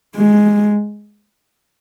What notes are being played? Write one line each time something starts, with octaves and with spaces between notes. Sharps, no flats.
G#3